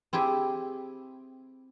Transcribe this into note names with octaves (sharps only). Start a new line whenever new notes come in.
C4 E4 G4 G#4